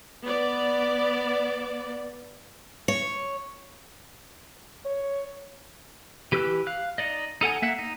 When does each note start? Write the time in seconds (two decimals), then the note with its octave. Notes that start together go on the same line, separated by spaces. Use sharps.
0.24 B3 D5
2.88 C#5
4.85 C#5
6.32 E3 G4 B4 E6 F#6
6.67 F5 F#6
6.98 D#4 D5 D#5
7.41 D#4 A4 F#5 G#5
7.62 A#3 E5 F#5
7.79 D#4